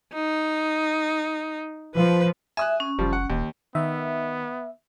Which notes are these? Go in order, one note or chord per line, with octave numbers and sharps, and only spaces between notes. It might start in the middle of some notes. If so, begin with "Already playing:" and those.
D#4
F3 B4
E5 G#5 D#6 F#6
C#4
F#1 F3 G3
F#5
D#1 D#2
D#3 B3 E5